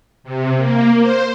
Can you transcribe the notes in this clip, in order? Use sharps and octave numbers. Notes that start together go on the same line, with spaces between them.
C3
A#3
C5